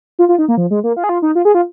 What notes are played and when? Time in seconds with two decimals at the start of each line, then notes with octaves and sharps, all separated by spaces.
0.19 F4
0.29 F4
0.38 D#4
0.48 A#3
0.57 F3
0.71 G#3
0.84 A#3
0.96 F4
1.04 G#4
1.09 F4
1.22 D#4
1.35 F4
1.45 G#4
1.55 F4